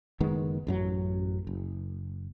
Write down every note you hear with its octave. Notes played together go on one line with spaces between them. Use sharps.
F#1 D#3 G#3 B3
A1 F#2 F#3
F#1